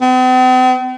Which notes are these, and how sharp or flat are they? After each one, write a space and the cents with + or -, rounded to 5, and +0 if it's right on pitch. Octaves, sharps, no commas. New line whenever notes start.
C4 -45